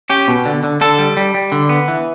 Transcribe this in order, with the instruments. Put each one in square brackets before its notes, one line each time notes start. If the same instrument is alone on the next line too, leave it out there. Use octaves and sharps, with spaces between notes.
[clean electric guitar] C#4 G4
B2
D3
D3
D3 A4
G3
G3
G3
D3
B3
E3